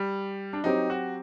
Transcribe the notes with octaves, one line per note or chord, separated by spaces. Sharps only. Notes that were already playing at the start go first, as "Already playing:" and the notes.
Already playing: G3
D4
F#3 C4 D#4 G4
F#4